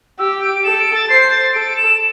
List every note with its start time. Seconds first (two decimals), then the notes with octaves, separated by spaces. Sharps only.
0.19 G4 E6
0.41 D7
0.64 A4 E7
0.80 D7
0.95 A6
1.09 C5 C7
1.31 A6
1.54 A4 D7
1.77 E7